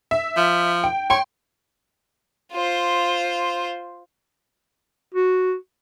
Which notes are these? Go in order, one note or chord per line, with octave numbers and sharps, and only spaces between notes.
E5
F3
G5
C#5 G5 C6
F4 C5
F#4